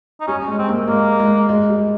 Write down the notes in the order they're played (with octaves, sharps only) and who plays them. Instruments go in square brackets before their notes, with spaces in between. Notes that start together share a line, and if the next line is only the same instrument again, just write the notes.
[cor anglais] D#4
[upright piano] G3 [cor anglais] C#4
[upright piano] G#3 [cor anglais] C#4
[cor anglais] C4
[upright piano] A#3
[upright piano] G#3 [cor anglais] A#3
[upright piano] G#3
G#3
G3